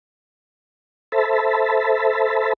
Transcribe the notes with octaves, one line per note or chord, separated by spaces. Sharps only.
A4 C5 E5 A5 B5